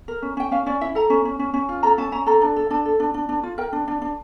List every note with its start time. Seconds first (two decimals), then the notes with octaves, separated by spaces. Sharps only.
0.08 A#4
0.22 C#4
0.37 C#4 G5
0.51 C#4 F5
0.66 C#4 D5
0.81 E4 E5
0.95 A4 A#5
1.10 C#4
1.25 C#4
1.39 C#4
1.54 C#4
1.69 F4
1.83 A4 A#5
1.98 C#4 A5
2.12 C#4 A#5
2.26 A4 A#5
2.41 D4
2.56 A4
2.70 D4 A5
2.85 A4
3.00 D4
3.14 D4
3.29 D4
3.43 F4
3.58 A#4 G5
3.73 D4
3.88 D4
4.02 D4